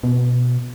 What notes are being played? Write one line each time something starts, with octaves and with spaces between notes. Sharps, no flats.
B2